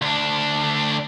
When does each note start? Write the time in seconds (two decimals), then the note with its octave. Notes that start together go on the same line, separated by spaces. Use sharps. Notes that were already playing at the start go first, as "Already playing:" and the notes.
0.02 D2 D4